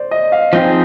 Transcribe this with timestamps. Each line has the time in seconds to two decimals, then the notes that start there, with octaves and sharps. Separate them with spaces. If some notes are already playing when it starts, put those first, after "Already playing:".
Already playing: C5 D5
0.11 D#5
0.32 F5
0.53 F3 C4 D#4 G#4 G5